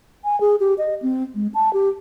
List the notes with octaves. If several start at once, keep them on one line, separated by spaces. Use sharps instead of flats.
G#5
G#4
G4
D#5
C4
G#3
A5
G4